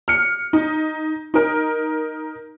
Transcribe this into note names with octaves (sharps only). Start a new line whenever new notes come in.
F6 C#7
D#4
D#4 A#4